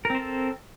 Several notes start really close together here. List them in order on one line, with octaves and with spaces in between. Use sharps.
A#4 C4 C5 A4